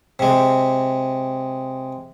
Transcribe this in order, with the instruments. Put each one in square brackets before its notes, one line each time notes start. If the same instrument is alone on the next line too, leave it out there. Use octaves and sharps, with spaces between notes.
[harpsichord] C3 G#3